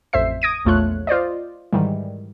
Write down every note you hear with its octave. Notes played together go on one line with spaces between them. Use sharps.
A1 F2 C5 E5 C7
D#6 G#6 A#6 D7 D#7
A#1 E2 A3 F4 C#5 F#6
F4 C5 D5 D#5
G#2 D#3 E3 G3